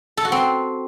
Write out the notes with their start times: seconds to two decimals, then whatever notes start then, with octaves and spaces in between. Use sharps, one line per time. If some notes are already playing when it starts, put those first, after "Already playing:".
0.17 A4
0.25 F#4
0.32 C4